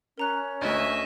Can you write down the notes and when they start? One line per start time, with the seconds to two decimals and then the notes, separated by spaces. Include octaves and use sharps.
0.18 C#4 A#4 A#5 F#6
0.61 D2 A3 D#5 E5